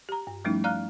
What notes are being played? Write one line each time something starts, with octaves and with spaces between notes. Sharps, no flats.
G4 A#5
G2
F3 G3 A3 C#4 D#4 E4
D5 F5 A#5 F6 F#6